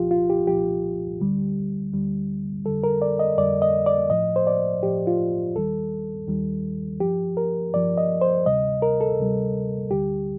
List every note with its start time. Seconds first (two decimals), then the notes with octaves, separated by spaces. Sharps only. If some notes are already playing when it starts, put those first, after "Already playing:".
Already playing: C2 A#2 F3 F4 G4
0.11 F4
0.30 G4
0.47 C2 A#2 F3 G4
1.20 D2 D3 G3
1.93 D2 D3 G3
2.65 F2 D3 G3 A4
2.84 A#4
3.02 D5
3.19 D#5
3.38 F2 D3 G3 D5
3.62 D#5
3.86 D5
4.10 A2 F3 D#5
4.36 C5
4.47 D5
4.83 A2 F3 G4
5.07 F4
5.55 D#2 D#3 G3 A4
6.28 D#2 D#3 G3
7.00 G2 F3 G4
7.37 A#4
7.73 G2 F3 D5
7.98 D#5
8.21 C5
8.46 D2 C3 G3 D#5
8.82 A#4
9.01 A4
9.19 D2 C3 G3
9.91 D2 D3 G3 G4